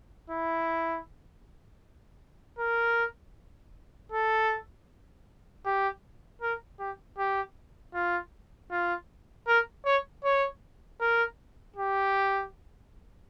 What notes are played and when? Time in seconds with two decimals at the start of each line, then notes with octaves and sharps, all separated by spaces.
0.30 E4
2.59 A#4
4.12 A4
5.65 G4
6.42 A#4
6.79 G4
7.18 G4
7.94 F4
8.71 F4
9.47 A#4
9.85 C#5
10.24 C#5
11.00 A#4
11.76 G4